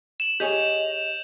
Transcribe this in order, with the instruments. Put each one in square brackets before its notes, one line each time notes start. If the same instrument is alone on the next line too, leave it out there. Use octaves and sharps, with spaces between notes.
[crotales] E7 F#7
[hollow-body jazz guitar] G4 G#4 C#5 [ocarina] D#5 [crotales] G6 F7